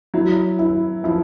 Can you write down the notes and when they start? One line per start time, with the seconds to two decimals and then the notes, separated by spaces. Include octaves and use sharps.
0.14 F#3 E4
0.59 E4
1.04 F3 E4